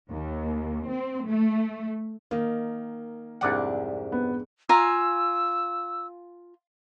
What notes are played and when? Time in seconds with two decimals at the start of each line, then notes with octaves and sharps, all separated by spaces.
0.11 D#2
0.90 C4
1.27 A3
2.31 D#3 A#3
3.41 C2 F2 G#2 D4 D5 F#5
4.12 B3
4.69 F4 G#5 A#5 E6